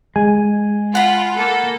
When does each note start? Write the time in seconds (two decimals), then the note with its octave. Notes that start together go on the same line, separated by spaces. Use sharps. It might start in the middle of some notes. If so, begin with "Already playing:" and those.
0.16 G#3 G#5
0.95 F4 F#5 B5
1.36 A#3 A4